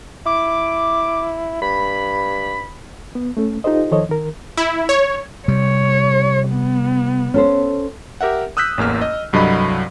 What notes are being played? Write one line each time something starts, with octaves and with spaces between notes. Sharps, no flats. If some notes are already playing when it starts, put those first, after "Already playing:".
E4 D6
G2 B5
B3
A3 C#4 A4
D#4 F4 G4 A4 C5 D#5
D#3 F3 A4 C5 C#5 D#5
D#3 A#4
E4
C#5
C3 G3 C#5
B3
C#4 A4 C5
G4 A#4 E5 F#5
D#6 E6 F#6 G6 B6
A1 E2 A#3 F6
D#5
C2 G2 F#3 A4 D#5 B5